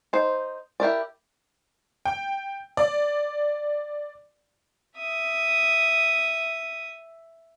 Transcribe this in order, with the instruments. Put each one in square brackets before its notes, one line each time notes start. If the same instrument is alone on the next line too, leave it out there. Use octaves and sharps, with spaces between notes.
[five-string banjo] D#4 C5
E4 G4 A#4 D5
[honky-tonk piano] G5
D5
[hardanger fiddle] E5 D#6